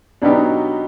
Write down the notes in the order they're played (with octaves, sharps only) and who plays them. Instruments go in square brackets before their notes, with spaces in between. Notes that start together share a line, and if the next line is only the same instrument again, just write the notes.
[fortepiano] B2 F#3 B3 D#4 G4 [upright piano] D4